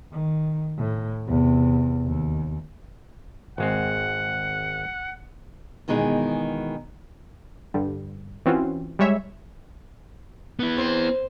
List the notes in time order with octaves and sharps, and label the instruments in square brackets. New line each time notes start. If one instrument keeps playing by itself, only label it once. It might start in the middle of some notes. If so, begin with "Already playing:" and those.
[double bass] D#3
A2
E2 C3
D#2
[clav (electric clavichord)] G#1 G#3 C4 [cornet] F#5
[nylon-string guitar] B2 D#3 E3 G#3 G#4
[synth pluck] G2 D3 G3
E3 C4 C#4 F4 F#4
G3 G#3 C#5 E5
[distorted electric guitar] B3 E4
[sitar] C4